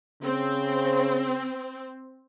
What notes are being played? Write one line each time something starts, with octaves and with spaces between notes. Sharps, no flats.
C#3 C4